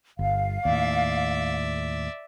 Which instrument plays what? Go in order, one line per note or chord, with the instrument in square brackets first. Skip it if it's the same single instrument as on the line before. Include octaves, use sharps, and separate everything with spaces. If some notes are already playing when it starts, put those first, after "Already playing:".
[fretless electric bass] G1 [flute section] F5
[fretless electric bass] D#2 A2 [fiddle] D5 E5